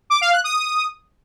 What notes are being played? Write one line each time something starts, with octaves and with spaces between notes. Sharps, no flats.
D6
F5
F#6
D#6